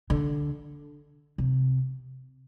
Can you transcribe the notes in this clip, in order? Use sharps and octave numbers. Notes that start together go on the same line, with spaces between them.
D3
C3